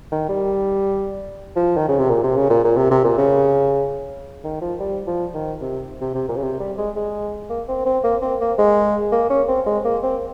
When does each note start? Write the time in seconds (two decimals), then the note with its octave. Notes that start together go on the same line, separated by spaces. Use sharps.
0.12 D#3
0.29 G3
1.56 F3
1.77 D#3
1.88 C#3
1.99 C3
2.10 A#2
2.24 C3
2.36 C#3
2.50 A#2
2.64 A#2
2.77 C3
2.91 C3
3.04 A#2
3.18 C#3
4.44 D#3
4.62 F3
4.80 G3
5.07 F3
5.34 D#3
5.61 C3
6.01 C3
6.15 C3
6.28 A#2
6.37 C#3
6.43 C3
6.60 G3
6.78 G#3
6.96 G#3
7.50 A#3
7.68 C4
7.86 C4
8.04 A#3
8.22 C4
8.41 A#3
8.58 G#3
9.12 A#3
9.30 C#4
9.48 C4
9.66 G#3
9.85 A#3
10.03 C4